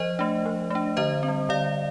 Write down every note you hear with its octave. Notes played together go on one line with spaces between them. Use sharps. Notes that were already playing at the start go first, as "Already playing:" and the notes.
Already playing: F3 C5 D#5
A3 D4
F3
A3 D4
D3 C5 D#5
C4
G3
D3 D5 F5